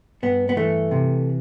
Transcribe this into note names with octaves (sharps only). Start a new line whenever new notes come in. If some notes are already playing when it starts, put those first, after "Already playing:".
G2 B3
B3
E3 A3
C3